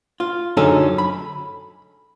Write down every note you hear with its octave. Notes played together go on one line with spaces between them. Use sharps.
F4
F#2 D3 C#4 D#4 G#4 A4
B5